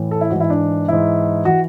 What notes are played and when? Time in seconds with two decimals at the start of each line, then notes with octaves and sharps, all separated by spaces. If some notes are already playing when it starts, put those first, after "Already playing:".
Already playing: A2 E3
0.11 A4
0.21 E4
0.31 G#2 E3 F#4
0.41 E4
0.50 D4
0.88 G#2 E3 E4
1.45 E3 F#4